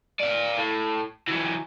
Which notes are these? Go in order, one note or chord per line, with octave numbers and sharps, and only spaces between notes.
D5 F5
A2
E3 F#3